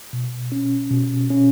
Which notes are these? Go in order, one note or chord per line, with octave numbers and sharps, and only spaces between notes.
B2
C#4
B2
C#4